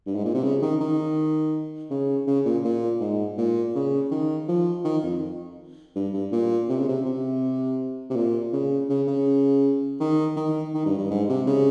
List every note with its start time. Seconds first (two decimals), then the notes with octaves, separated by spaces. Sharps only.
0.06 G2
0.15 G#2
0.25 A#2
0.34 C3
0.43 C#3
0.62 D#3
0.80 D#3
1.91 C#3
2.27 C#3
2.45 A#2
2.64 A#2
3.01 G#2
3.38 A#2
3.75 C#3
4.11 D#3
4.48 F3
4.85 D#3
5.03 F2
5.95 G2
6.13 G2
6.32 A#2
6.69 C3
6.78 C#3
6.89 C3
7.06 C3
8.10 C3
8.16 A#2
8.53 C#3
8.89 C#3
9.08 C#3
10.00 D#3
10.36 D#3
10.74 D#3
10.86 G2
10.98 G2
11.11 G#2
11.29 C3
11.47 C#3